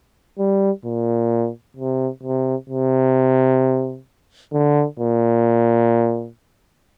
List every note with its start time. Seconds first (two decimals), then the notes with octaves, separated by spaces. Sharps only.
0.39 G3
0.85 A#2
1.77 C3
2.23 C3
2.69 C3
4.53 D3
4.99 A#2